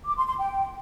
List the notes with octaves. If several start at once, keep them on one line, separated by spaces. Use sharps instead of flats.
D6
C6
C6
G5